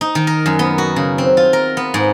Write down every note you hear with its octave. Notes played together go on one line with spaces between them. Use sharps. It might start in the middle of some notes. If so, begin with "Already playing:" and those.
D#4
D#3
A#4
F#2
B3
F#4
C#3
C4
F4
A#4
B3
G#2